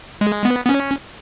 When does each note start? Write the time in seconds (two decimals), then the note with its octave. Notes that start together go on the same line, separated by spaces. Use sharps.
0.21 G#3
0.45 B3
0.65 B3
0.69 C#4